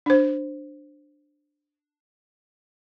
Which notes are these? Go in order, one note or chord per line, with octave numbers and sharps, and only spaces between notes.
D4 C5